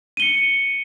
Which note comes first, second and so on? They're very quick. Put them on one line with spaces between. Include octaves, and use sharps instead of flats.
D#7 G7 C#7